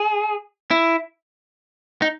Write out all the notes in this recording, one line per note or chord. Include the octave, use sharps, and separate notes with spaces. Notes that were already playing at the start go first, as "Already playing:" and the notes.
Already playing: G#4
E4
D#4